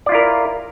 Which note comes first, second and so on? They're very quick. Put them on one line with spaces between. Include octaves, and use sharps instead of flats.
D5 F4 E4 A#4